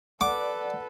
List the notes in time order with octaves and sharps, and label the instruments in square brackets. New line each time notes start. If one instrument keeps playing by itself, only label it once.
[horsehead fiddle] A4 B4 [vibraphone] D5 [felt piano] F#5 [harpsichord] D6